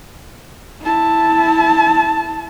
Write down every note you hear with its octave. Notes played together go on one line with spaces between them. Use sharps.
E4 A5